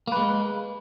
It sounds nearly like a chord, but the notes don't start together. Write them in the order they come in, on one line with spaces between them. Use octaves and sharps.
A#3 B4 G#3